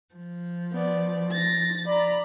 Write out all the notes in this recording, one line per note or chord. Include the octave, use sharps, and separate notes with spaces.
F3
B3 D5
A6 A#6
D5 A#5 B5